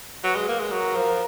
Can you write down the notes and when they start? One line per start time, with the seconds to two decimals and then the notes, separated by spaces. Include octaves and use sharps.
0.24 F#3 B4
0.36 G#3
0.48 A#3
0.60 G#3
0.72 F#3 A#4
0.96 F3